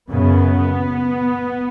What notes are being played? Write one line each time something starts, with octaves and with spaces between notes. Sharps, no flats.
F#2 C#3 B3